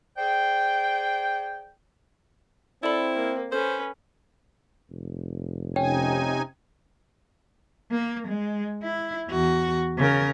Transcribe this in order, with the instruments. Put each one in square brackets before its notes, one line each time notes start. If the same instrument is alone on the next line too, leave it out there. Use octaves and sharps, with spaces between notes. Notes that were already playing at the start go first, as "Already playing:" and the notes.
[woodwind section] G#4 C5 D5 G5
[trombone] C4 [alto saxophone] E4 [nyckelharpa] A4 [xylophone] D5 B5
[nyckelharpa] A#3
[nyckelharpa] C#4 B4 [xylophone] A4 [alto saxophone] C5
[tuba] F1
[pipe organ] C3 D#4 G#5 [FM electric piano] C#4 [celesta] G5
[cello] A#3
G#3
E4
E2 F#4
C#3 A#4